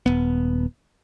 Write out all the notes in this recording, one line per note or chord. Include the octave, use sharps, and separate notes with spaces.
D#1 B3